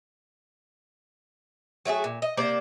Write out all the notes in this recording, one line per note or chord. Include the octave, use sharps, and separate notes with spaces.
F#3 A3 F#4 G#4
A#2
D#5
C3 A#3 C5 D5